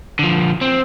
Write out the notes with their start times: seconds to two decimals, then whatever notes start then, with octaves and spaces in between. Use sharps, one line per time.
0.19 D3 F3
0.61 C4